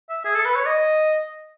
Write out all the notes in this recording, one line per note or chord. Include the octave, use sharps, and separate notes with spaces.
E5
G#4
A4
B4
C#5
D#5